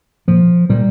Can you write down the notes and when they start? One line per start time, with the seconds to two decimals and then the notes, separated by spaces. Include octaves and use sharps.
0.28 A#2 F3
0.69 A#2 G3